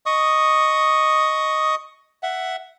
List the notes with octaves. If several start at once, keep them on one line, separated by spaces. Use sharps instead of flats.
D#5 C#6 D#6
E5 F#5